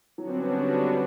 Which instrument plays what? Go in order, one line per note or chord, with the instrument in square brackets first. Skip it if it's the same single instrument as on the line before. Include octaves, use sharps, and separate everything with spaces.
[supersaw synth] D3 G3 B3 D4 F#4 [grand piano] F#3
[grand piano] C4
C#4
C#4